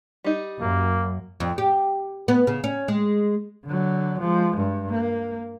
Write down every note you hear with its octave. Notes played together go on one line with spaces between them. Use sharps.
G3 D#4
F#2 A#3
F2
G4
B3
C#3
C#4
G#3
D3 F#3
F3 G#3
G2
A#3